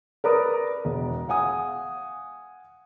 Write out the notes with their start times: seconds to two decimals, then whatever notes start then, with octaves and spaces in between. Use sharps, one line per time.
0.24 A#4 B4 D5 A#5 B5 D#6
0.85 E1
1.28 F5 F#5 G#5 D#6